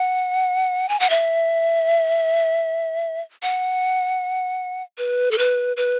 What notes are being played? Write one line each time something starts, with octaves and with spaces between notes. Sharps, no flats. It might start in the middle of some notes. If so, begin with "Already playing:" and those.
Already playing: F#5
G#5
F#5
E5
F#5
B4
A4
B4
B4